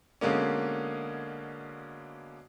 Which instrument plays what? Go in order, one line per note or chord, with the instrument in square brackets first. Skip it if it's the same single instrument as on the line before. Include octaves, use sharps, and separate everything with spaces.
[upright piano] B2 D3 G#3 A#3 C#4